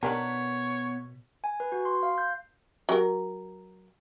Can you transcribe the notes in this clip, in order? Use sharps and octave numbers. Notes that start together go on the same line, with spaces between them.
B2 D#3 B3 D4 A#4 C#5 F#5
G#5
B4
F#4
C6
F5
G6
F#3 A#4